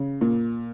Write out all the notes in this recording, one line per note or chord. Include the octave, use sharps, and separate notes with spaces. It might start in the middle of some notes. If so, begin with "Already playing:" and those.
Already playing: C#3
A#2